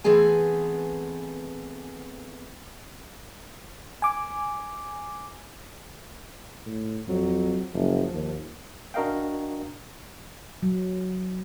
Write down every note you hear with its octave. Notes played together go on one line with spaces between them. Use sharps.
E3 A3 B3 C4 G#4 G#5
G#5 D6
A2
F2 F#3
F#1 F3
D#2
D4 F#4 A#4 D#5 F5 G5
F#3